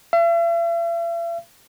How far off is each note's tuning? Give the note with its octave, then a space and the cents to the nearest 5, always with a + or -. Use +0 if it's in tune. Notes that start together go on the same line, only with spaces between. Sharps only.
E5 +45